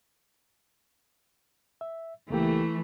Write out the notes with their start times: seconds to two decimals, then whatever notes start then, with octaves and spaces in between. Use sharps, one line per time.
1.81 E5
2.30 C#2 E3 A3 A#3 G4